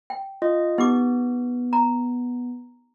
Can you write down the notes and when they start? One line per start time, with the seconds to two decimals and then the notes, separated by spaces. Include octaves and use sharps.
0.10 G5
0.42 F4 D#5
0.78 B3 D#4 G4 D6
1.73 A#5